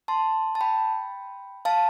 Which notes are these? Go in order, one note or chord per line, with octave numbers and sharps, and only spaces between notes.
A5 C6
A5
G5 B5
F5 A5